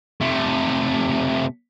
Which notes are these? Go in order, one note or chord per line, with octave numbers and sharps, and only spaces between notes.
C3 A3